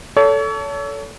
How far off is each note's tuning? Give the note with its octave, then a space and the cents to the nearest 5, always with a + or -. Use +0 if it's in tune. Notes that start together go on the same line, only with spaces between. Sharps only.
A4 +0 C#5 +35